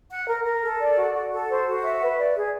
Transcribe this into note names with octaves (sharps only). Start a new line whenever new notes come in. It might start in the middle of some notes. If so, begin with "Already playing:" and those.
F#5
A#4
A#4
A4
D5
F#4
F#4
A4
C5
F#4
E5
B4
D5
G#4